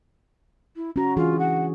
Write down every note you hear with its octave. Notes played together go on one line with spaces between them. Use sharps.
E4
C#4 F#4 A#5
E3 D4 F4 G#4
F#5